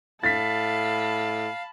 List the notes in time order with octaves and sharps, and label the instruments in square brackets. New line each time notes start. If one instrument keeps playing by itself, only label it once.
[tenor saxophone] A2 [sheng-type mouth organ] F5 [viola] A5 B5 [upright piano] A6 B6